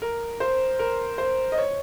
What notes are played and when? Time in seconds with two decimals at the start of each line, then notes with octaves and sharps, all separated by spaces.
0.02 A#4
0.40 C5
0.79 A#4
1.18 C5
1.52 D#5
1.58 C#5